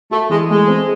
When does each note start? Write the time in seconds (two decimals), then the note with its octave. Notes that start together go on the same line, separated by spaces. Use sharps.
0.11 A3 F#4
0.30 E3 G#3
0.49 G#3 A3
0.68 C4